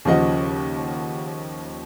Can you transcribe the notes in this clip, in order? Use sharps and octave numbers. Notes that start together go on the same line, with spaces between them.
D#2 C#3 F3 D#5 F#5